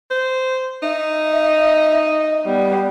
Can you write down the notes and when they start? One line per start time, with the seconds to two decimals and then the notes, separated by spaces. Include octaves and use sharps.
0.11 C5
0.83 D#4 E5
1.19 D#5
2.45 G3 B3